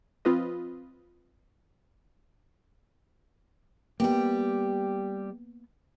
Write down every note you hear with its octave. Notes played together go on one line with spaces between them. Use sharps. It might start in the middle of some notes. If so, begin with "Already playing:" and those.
F3 C4 F4 B4 D#5
G3 A#3 B3 G4